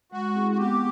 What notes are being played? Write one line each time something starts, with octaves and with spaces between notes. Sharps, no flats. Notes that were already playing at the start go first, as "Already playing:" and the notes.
G#3 F#4
C4 E4 G#4
F#4
B3 G4